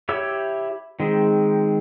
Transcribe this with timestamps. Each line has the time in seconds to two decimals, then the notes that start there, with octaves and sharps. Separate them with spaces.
0.09 E4 G4 C#5 E5 E6
1.00 D#3 G#3 C4